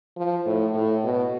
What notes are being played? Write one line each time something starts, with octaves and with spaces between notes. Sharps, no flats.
F3
A2
A2
B2